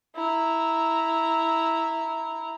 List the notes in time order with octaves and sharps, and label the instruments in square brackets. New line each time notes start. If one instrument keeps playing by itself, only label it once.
[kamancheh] E4 A#5